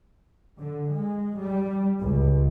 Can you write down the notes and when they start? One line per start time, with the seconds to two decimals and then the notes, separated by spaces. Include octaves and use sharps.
0.59 D3
0.90 G#3
1.38 G3
2.00 C#2